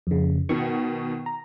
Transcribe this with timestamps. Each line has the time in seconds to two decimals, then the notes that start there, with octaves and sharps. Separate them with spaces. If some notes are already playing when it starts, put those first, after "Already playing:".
0.07 F2 C#3
0.49 B2 D#3 C#6
1.26 A#5